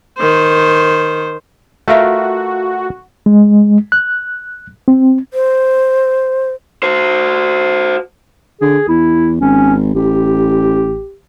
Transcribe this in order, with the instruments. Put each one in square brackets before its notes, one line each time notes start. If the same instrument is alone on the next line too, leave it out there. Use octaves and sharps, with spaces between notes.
[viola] D#3 C5
[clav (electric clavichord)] A3 F4 A#4 [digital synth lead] F#4 [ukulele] B4 E5 F5
[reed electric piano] G#3
F#6
C4
[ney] C5
[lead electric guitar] F#4 C5
[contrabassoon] D3 [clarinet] G#4
[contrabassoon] E2 [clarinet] E4
[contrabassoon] G#1 [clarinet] C#4
[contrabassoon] A1 [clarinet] G4